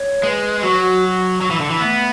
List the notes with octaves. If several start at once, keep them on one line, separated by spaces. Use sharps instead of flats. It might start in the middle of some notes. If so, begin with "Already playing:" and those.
Already playing: C#5
G#3 B4
F#3 F#4
F#3
E3
D3
E3
A3 B3